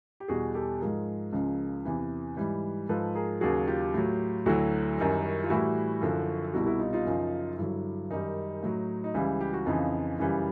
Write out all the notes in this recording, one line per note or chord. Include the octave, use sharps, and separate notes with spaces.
G4
E2 B2 G3 F#4 G#4
G4 A4
G#2 F3 G#4 A#4
C#2 C#3 F3
E2 C3 E3
G#2 E3 G3
G#2 F3 A4 B4
G#4 A#4
D#2 C#3 F#3 F#4 G#4
F4 G4
A2 F#3
D2 D3 F#3 E4 F#4
F#2 D#3 G3
F4
A2 E3 G3 E4 F#4
F#2 D3 F3
C2 B2 G3 E4 F#4
E4 F#4
D#4 F4
D#4 F4
F#2 C#3 F3
G2 D3 F#3 E4
F#2 D#3 G3 D#4
A2 F#3
D#4
C#2 C#3 E3 G3 E4
G4
F#4
F2 C#3 E3 D#4 F4
F#2 C#3 E3 G3